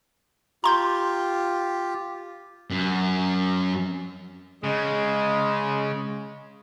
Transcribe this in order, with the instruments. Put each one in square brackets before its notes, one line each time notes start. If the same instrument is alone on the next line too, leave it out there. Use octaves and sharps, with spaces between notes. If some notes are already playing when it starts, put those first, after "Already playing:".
[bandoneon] F4 G4 [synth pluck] A#5 C6 G6
[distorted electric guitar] F#2
[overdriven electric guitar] C#3 [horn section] G#3